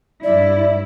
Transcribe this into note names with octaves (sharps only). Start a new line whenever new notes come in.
G2 E4 D5